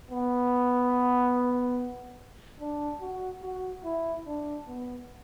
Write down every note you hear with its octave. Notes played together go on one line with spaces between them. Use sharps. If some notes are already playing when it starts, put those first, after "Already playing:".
B3
D4
F#4
F#4
E4
D4
B3